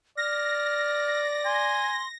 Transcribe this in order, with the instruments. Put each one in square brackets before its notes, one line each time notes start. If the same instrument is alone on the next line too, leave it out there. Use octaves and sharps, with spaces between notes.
[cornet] D5 [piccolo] F6 [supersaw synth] A#6
[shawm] G#5 [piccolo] C6